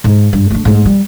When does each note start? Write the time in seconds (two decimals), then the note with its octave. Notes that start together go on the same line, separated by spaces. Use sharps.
0.04 G#2
0.33 G2
0.50 D3 A3
0.65 G#2 A3
0.86 G3